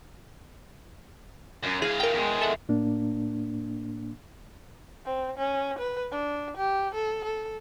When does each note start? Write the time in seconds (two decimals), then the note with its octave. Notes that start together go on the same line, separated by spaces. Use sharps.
1.64 F#2
1.82 E3 G#4 F5
2.00 A#4 G5
2.13 E2 G#3
2.41 A4 E5 F#5
2.69 A2 A#3 D4
5.05 C4
5.37 C#4
5.79 B4
6.11 D4
6.57 G4
6.95 A4
7.24 A4